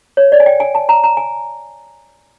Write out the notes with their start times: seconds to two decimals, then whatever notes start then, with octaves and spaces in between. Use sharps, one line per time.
0.17 C#5
0.32 D5
0.40 G#5
0.46 G5
0.60 G#5
0.75 A5
0.89 A#5
1.04 A#5
1.17 G#5